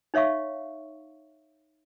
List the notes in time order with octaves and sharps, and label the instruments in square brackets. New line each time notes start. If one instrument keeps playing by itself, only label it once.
[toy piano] D#4 C#5 E5 F5 C#6